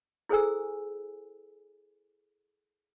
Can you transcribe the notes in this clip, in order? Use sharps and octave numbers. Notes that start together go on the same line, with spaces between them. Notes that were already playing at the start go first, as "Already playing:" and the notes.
E4 G#4 A4 C5 G#5 E6